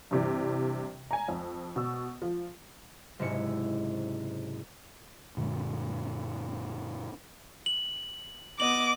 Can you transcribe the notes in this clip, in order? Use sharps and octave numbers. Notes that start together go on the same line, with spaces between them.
G2 C3 E3
G#5 A#5
F2
B2 E6
F3
F#1 G#2 C3 E4 C#7
F#2 A#2 D3 G#3
F#7
B3 D#5 D6 F#7